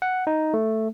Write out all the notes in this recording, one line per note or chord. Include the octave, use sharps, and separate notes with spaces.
F#5
D#4
A3